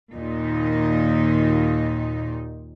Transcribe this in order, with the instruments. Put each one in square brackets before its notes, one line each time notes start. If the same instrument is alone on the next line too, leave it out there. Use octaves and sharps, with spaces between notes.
[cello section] D#2 A#2 D#4